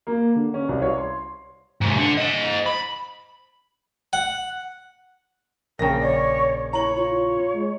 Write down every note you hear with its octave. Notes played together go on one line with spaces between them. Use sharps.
A#3
D3
C#4
C2
C#5
C6
G#2 C3
D3
C5 D#5
B5
F#5
A#1 C#3 A#4 G5 A#6
C#5 D5
E4 C#5 A#5 F#7
F4 C#5
G#3